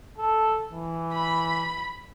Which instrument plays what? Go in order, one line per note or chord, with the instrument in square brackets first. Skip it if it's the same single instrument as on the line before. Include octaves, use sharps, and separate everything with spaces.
[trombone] A4
E3
[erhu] B5